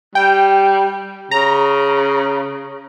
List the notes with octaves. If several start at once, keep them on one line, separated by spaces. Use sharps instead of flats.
G3 G5
C#3 A#5